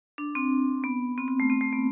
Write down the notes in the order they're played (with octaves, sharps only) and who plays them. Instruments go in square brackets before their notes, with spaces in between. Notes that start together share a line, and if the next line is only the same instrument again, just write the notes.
[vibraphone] D4
C4
B3
C4
C4
A3
C4
A3
B3